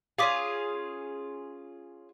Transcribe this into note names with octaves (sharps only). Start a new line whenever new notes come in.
C#4 F4 G#4 F5 D6 B6